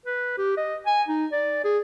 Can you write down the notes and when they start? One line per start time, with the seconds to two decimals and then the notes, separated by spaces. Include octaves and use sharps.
0.06 B4
0.38 G4
0.57 D#5
0.86 G#5
1.08 D#4
1.32 D5
1.64 G#4